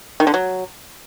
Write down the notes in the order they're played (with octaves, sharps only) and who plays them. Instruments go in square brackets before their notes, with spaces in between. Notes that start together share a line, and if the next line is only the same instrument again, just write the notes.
[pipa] D#3
D3
F#3